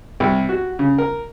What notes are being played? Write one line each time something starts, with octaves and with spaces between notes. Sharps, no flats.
C2
F#4
C#3
A#4